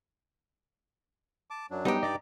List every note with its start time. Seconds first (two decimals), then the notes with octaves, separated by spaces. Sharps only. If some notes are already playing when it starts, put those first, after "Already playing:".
1.50 A5 D6
1.71 F#2 F#3 D4
1.85 G3 B3 D#4 G4 D#5
2.03 G2 D5 D#5 A#5 D6